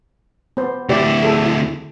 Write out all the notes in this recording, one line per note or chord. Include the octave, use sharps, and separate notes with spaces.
B3 C5
D2 E4 G4 D5
G#4 A4